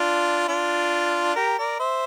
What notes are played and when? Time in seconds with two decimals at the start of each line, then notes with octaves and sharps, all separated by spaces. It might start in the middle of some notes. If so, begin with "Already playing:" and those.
Already playing: D4 F4
0.48 D4 F4
1.36 G4 A#4
1.58 A#4 D5
1.80 C5 E5